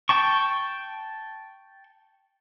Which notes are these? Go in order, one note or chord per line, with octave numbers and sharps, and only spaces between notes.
G5 A5 C#6